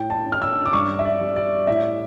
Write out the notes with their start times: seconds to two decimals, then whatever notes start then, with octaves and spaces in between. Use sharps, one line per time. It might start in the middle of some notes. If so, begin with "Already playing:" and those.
Already playing: A2 G5
0.10 A5
0.26 C#4
0.32 F6
0.42 E6
0.65 D6
0.73 G2 C#6
0.99 E5
1.05 D5
1.21 G3
1.36 D5
1.67 A2 E5